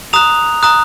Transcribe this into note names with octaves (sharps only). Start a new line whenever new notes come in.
A#5 D#6 F#6 F7
A#5 D#6 F#6